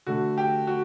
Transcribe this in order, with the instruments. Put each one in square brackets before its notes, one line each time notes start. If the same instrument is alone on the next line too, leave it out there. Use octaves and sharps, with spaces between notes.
[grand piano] D3 A3 F#4
G4
F#4